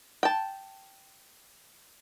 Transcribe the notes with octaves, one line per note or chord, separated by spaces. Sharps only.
G5 A5